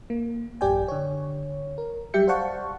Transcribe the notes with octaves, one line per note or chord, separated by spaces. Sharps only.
A#3
A1 F#2 G4 D5 G5 G#5
D3 C#5
A#4
F#3 G3 G4 E5 G6 C#7
C5 D5 F5 F#5 A5 C#6